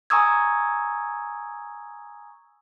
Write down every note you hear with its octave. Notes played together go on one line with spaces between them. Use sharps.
G#5 A#5 C#6 D#6 E6 G#6